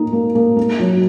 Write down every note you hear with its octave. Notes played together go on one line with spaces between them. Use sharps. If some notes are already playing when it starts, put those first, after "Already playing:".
Already playing: A#3 D#4
A#3
A#3
A#3
F#3